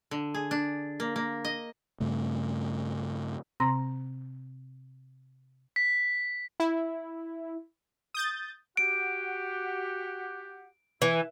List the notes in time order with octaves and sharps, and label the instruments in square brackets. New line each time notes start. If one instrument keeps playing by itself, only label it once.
[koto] D3
G#4
D4
A#3
A#3
D#5
[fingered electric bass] G2 C#3 A3
[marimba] C3 C4 A#5 C6 A#6
[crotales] B6
[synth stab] E4
D#6 G6 A6
[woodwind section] F#4 G4 F#5 [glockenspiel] D7
[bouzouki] E3 [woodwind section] E4